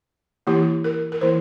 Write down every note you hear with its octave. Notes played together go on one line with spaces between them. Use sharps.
E3 A#3 E4 G4
A#4
A#4
E3 A#3 E4 C5